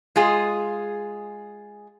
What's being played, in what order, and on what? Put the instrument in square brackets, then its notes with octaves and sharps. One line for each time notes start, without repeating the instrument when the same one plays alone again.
[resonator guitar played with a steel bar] G#3 F4 G#4